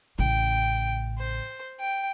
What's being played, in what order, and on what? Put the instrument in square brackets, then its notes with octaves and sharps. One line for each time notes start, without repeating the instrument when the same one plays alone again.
[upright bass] A1 C#3 [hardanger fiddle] G5
[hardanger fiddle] C5
G5